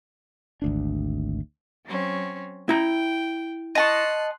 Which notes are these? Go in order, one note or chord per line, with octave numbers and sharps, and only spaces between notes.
G#1 D2 D4
F#3 C4 C#4
E4 G5 A#5
D#5 A5 C6 C#6 F#6